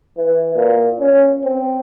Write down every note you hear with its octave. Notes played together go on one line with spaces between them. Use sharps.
E3
A#2
C#4
C4